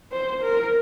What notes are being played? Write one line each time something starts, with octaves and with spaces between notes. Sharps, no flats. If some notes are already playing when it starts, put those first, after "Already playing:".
C5
A#4